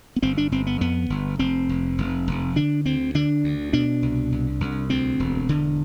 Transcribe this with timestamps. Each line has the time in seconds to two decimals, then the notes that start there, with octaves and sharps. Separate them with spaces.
0.16 B3
0.22 G1 C4
0.37 D4
0.52 G1 C4
0.67 B3
0.81 F2 B3
1.10 G1
1.39 F1 C4
1.69 F1
1.98 F1
2.27 F1
2.56 D3 D4
2.85 D2 C4
3.15 D3 D4
3.44 D2
3.73 B2 D4
4.02 C2
4.32 C2
4.60 C2
4.90 D2 C4
5.20 E1
5.49 E1 D3